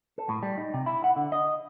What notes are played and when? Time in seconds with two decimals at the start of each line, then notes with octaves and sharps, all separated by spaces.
0.18 A4
0.29 A2
0.43 G3
0.58 D#4
0.74 C3
0.86 E4
1.04 F#5
1.16 D3
1.32 D#5